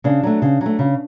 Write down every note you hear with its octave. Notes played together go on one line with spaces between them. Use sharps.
C#3 D4
F#3 A3
C#3
F#3
A3
C#3